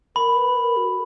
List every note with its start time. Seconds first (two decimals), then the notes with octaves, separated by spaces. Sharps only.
0.16 A#4 B5
0.36 B4
0.57 A#4
0.77 F#4